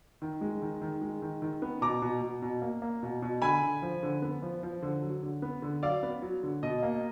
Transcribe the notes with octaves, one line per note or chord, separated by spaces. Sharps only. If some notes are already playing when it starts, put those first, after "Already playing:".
D#3
G#3
D#3
D#3
G#3
D#3
D#3
B3
B2 A#5 D6
B2
B2
B2
A#3
A#3
B2
B2
D3 G#5 B5
D3
F3
D3
B3
F3
F3
D3
F#3
D3
B3
D3
F#3 D5 F5
B3
F#3
D3
B2 D#5
A#3